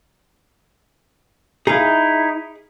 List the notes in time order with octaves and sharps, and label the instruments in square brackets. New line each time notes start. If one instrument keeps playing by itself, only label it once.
[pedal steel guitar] D#4 E4 [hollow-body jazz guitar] G#4 F5